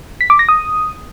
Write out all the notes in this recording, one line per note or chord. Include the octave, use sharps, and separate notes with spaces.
B6
D6
A#6
D#6